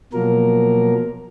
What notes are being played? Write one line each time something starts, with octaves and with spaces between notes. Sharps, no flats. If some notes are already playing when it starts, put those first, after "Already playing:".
B2 F3 F#3 A#3 A#4